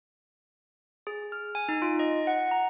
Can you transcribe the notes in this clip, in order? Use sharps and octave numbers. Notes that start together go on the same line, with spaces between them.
G#4
F6
G#5
D#4
F4
D#5
F#5
A#5